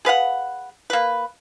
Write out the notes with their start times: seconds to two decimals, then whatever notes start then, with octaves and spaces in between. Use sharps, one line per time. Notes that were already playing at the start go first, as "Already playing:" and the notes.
0.05 G#4 B4 F5 F#5
0.90 A#3 B4